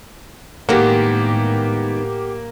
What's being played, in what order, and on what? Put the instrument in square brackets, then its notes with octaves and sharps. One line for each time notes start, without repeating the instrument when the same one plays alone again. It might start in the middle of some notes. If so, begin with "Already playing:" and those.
[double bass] A2 [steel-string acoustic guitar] D#3 G#3 B3 [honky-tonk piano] A#3 [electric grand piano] G4 F#5